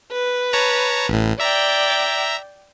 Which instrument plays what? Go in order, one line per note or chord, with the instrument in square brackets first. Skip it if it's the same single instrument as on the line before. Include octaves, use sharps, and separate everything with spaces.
[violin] B4
[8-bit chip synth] C#5 A5 A#5
A1 A2
[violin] D5 G5 [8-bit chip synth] E5 A#5